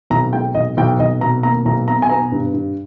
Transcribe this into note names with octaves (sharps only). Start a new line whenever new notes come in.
B1 A#5
G#3 G5
B1 D#5
B1 G5
B1 D#5
B2 A#5
A#3 A#5
B1 A#5
B2 A#5
G#5
B3 A#5
G2
G2